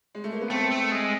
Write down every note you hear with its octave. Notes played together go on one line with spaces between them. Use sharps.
G#3
A3
A#3
B3
A3 C4
A3
G#3